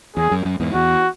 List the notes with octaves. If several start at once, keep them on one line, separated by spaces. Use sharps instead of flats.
E2 G#4
F#2
F#2
E2 G#2
E2 F#4